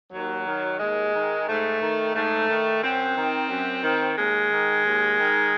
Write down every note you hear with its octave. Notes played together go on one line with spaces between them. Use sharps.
D#2 F#3
D#3
D#2 G#3
D#3
G#2 A3
D#3
G#2 A3
D#3
F#2 C4
D#3
F#2
D#3
D#2 G#3
D#3
D#2
D#3